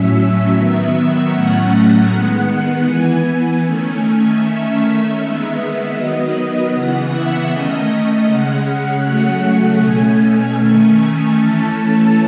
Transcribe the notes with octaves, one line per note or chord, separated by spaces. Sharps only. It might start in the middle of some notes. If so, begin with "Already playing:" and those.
Already playing: A2 F#3 C#4 E5
D#3 F#3 B3
A2 F#3 A3 C#4 F#5
D#3 G#3 B3
E3 B3 G#5
D#3 A3 C#4
D#3 A3 C#4 E5
D#3 G#3 B3
D#3 F#3 B3 D#5
C#3 E3 B3 F#5
E5
D#3 A3 C#4 D#5
C#3 G#3 C#4 F#5
C#3 F#3 A3 C#4
B2 A3 C#4 G#5
D#3 A3 C#4
E3 A3 C#4 A5